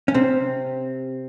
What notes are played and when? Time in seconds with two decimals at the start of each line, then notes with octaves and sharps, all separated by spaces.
0.08 C#4
0.14 C3 C4